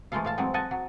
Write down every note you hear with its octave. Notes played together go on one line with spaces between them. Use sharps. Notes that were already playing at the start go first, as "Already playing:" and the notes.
E3 G#3 A3 F4 A4 F5
A2 F5 A5
E3 F#3 G#3 C4
A4 D#5 F#5 G#5 A5
F#3